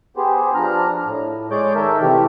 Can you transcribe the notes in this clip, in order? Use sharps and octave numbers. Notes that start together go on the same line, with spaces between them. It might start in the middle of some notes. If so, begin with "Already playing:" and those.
B3 G4 G#4 C5
F3 D4 A#5 F6
A2
G#3 G#4 C#5 D5 D6 G6
D#3 A4 A#4 E5
C3 E3 A3 G4